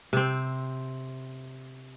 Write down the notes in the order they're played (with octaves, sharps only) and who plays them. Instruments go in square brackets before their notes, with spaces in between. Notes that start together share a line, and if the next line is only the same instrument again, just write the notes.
[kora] C3 C4